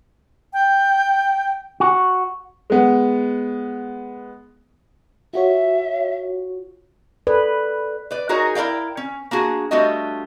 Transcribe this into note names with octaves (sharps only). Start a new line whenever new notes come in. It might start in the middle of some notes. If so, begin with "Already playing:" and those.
G5
F#4
G#3 B3
F4 F#4 C#5 E5
A4 B4 D5
B4 D5
D#4 F#4 G#4 A#4 C#5
E4 A#4 D5 F5 G5
C#4
A#3 D4 F#4 G#4
G3 A3 D4 F4 F#4 D#5